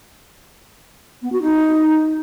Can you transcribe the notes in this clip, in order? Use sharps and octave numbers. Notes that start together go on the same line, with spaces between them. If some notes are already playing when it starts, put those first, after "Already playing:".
B3
F#4
D#4